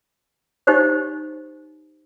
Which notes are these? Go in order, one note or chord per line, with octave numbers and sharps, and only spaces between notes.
D#4 G4 C5 C#5